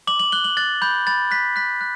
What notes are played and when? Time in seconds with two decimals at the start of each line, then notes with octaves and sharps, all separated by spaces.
0.07 D6 F#7
0.20 F#7
0.32 F#6 G7
0.44 F#7
0.57 F#6 A6
0.82 B5 G6
1.07 B5 A6
1.31 F#6 B6
1.56 F#6 B6
1.81 F#6